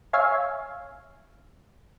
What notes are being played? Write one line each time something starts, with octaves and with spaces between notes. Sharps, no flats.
C#5 E5 F5 G#5